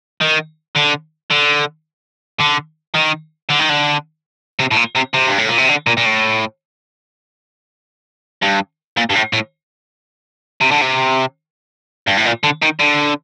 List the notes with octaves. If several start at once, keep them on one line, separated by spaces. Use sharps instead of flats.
D#3
D3
D3
D3
D#3
D3
D#3
D3
C3
A2
A#2
C3
C3
G2
A2
A#2
C3
D3
A#2
A#2
A2
G2
A#2
G2
A2
A2
C3
D3
C3
G2
A2
A#2
D3
D#3
D3